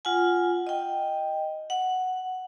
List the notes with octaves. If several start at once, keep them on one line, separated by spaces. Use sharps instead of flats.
F4 F#5 G#5
D#5 G5
F#5